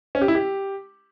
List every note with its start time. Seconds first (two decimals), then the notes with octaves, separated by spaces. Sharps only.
0.15 C#4
0.22 G4
0.28 E4
0.35 G4